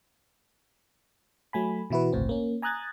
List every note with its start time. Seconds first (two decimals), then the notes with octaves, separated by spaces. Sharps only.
1.53 F#3 A3 G#5 B5
1.90 B2 E3 E4 F#4 B4
2.13 G1 C#2 A2 C4
2.29 A#3 C#4
2.62 G#5 A#5 D#6 F#6 G#6 A6